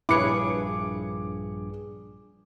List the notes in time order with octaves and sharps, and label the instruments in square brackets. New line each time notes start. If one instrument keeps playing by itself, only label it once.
[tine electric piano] A#1 G2 G#4 [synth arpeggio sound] E4 B4 C#5 [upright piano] D6 C#7